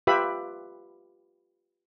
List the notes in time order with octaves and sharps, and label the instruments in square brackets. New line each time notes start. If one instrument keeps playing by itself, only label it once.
[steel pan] F4 G4 B4 E5 B5